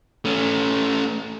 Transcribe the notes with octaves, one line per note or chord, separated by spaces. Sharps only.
A3 C#4